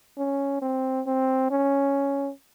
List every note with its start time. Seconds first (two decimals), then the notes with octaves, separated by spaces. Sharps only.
0.18 C#4
0.62 C4
1.07 C4
1.51 C#4